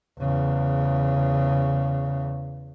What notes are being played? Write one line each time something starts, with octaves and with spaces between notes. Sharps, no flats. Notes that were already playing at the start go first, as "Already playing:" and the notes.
E2 C#3